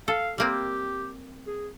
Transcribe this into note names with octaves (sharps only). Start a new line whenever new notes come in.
A4 F5
G3 A#3 C4 G4
G#4